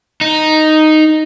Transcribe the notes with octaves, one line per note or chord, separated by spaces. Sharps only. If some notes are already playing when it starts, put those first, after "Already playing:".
D#4